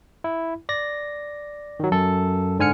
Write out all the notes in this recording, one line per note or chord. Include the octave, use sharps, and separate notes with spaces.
E4
D5 A#6
D#3 F#3
F#2 A4
G#2 D3 G#5 F6 C#7